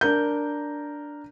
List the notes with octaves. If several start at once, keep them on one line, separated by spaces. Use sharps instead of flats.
D4 A#4 G6